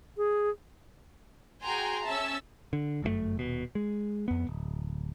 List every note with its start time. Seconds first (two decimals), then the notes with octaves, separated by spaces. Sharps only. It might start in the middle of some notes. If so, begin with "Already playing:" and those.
0.17 G#4
1.63 F#4 G#4 G5 G#5 A#5 C6
2.05 C#4 E5 A5 E6
2.73 D3
3.02 G1 F#2 E3 A3
3.37 D#1 B2
3.75 G#3
4.28 F2 B3
4.47 D1